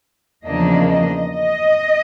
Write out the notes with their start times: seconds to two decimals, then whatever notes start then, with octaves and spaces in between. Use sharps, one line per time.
0.44 E2 C#3 F3 A#3 D4 D#5
0.88 D#5
1.32 D#5